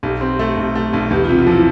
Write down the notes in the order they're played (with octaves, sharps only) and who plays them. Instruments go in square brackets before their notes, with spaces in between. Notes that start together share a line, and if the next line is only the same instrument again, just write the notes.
[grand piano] B1 [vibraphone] G4
[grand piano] C4
A3
B1
A3
B1
[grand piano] E2 [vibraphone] G4
[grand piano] C3 [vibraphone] F4
[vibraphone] F4
[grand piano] F3 [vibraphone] E4